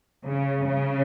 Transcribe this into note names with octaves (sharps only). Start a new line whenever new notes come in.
C#3
C#3